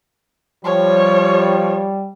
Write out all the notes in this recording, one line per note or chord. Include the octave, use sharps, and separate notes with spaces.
F3 G3 C#5